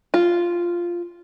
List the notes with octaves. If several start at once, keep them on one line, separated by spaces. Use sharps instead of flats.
F4